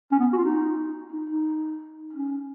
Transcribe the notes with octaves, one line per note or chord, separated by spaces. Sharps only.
C#4
B3
F#4
F4
D#4
D#4
D#4
C#4